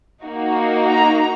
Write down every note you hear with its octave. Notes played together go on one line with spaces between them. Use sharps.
A#3 D#4 F#4
A#5